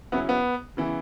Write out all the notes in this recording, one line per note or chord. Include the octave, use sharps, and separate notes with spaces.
C#3 F#3 B3 C#4 E4
B3
C#3 E3 B3 E4